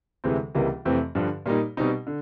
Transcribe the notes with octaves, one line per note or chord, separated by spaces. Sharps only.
D2 C3 E3 G#3 C4
C#2 C3 E3 G3 A#3
F2 C3 E3 A3 C4
G2 D3 F3
A#2 G3 A#3 D#4
B2 G3 C4 D#4
D3